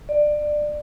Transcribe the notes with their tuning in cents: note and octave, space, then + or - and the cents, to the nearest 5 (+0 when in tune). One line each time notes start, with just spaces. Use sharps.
D5 +20